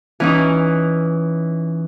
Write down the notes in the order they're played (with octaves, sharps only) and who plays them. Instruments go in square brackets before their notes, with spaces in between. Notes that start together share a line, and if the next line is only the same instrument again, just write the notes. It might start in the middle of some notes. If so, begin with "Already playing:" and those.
[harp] E3 C#4 D#4